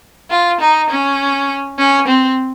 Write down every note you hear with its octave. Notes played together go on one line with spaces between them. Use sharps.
F4
D#4
C#4
C#4
C4